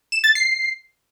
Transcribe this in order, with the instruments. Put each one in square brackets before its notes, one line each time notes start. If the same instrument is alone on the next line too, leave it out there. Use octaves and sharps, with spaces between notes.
[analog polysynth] E7
A6
C7